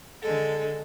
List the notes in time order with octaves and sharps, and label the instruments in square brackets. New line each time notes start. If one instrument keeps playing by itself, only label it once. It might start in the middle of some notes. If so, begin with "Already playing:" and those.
[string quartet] D3 G#3 A4